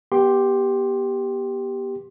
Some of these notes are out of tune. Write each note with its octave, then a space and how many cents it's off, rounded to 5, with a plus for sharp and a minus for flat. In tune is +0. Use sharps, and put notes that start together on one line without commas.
B3 -25 G4 +0 C6 +15